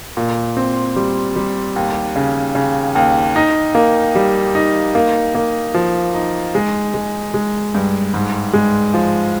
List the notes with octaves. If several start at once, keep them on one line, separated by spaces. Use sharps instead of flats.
A#2
C4
G3
G3
D#2
C#3
C#3
D#2
D#4
A#3
G3
D#4
A#3
A#3
F3
D#4
G#3
G#3
G#3
G2
G#2
G#3
F3